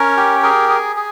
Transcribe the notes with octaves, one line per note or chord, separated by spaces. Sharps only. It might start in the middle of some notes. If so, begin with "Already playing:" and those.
Already playing: C#4 A#4
G4
G#4 A#4
G#4
G#4